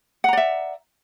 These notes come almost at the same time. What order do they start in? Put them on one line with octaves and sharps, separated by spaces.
F#5 A#5 D5 E5